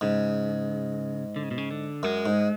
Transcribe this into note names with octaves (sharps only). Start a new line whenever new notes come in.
G#2 C#3
D3
C#3
B2
C#3
D3
F#2 G#3
G#2